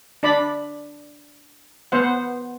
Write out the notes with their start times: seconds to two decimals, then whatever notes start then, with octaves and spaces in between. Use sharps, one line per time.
0.23 D4 D5 B5
1.92 B3 C5 F#5